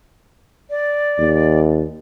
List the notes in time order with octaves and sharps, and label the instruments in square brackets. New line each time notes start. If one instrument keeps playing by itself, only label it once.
[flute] D5
[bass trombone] D#2